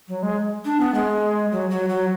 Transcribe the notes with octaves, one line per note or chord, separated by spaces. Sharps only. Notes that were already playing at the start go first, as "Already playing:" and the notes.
F#3
G#3
D4
B3
G#3
F#3
F#3
F#3